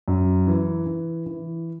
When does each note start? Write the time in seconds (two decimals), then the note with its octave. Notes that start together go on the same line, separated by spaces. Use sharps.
0.08 F#2
0.47 E3
0.86 E3
1.26 E3